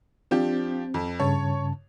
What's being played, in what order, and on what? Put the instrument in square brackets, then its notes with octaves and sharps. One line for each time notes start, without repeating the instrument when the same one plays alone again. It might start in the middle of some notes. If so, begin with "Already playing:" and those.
[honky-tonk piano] F3 D4 G4 [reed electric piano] C4
[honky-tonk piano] F2
[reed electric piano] G2 C#3 A5 [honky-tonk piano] C#5